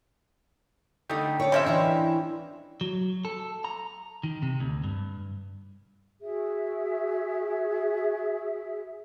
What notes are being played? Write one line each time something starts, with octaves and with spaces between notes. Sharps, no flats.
D3 G3 A3 D#4 G4
C#5 D5 D6
F3 G#3 C4 C#4 G4 E5
E3 D4 A#5 C#6
F#3
A4
A#5
D#3
C3
D2
G2
F#4 G#4 E5